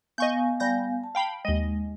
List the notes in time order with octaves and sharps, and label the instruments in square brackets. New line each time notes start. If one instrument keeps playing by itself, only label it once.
[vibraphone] B3 F5 G#5 [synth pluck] D#5 C#6 G6
[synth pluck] G3 G6 A#6
[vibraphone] A5
[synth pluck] F5 G5 B5
[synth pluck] D#2 D#5 [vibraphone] G#3